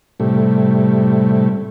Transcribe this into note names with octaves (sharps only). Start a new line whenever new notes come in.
A2 C3 G3 A3